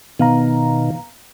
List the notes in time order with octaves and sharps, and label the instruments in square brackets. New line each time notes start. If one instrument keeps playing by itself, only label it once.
[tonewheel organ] B2 D#3 [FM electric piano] B3 F5 A#5